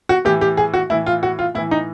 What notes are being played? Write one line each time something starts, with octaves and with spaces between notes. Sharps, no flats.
F#4
A2 E3 G4
G4
G#4
F#4
A2 E3 E4
F4
F#4
F4
A2 E3 E4
D#4